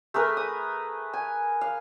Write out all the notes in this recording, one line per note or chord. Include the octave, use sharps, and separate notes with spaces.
A3 G#4 A#4 B4
D#6
G#5
F5